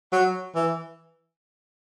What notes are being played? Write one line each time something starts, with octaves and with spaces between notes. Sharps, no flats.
F#3
E3